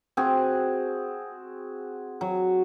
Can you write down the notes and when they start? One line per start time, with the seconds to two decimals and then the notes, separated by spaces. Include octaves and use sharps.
0.17 C4 F#4 G#4
2.21 F#3